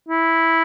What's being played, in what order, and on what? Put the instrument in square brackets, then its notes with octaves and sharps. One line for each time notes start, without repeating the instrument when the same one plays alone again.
[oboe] E4